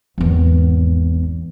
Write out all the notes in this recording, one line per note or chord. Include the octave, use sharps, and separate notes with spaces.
G#1 E2